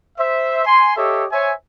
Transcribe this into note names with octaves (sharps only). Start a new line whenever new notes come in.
C5 E5
G#5 C6
G4 A4 C#5 D#5 E5
C5 C#5 E5 G#5